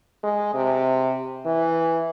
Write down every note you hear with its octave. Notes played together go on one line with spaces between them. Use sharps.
G#3
C3
E3